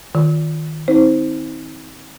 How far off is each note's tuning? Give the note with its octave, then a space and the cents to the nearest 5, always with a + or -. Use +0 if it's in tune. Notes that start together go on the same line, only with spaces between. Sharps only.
D#3 +0 F4 +0
C4 +0 D#4 +45 C5 +0